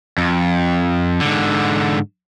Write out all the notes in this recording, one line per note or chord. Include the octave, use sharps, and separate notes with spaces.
F2
G#2 D3